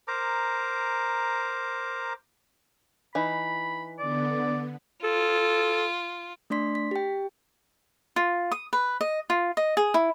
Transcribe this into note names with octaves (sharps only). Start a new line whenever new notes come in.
A#4 C5 A#5 D6
E3 D#4 B5
D3 B3 D5
F4 A4
A3 D4 D5 C6 B6
B6
G4 G5
F4
D#6
B4
D#5
F4
D#5
G#4
E4